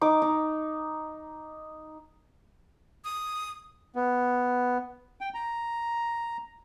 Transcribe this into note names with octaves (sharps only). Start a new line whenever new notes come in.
D#4 D6
D#4
D#6
B3
G5
A#5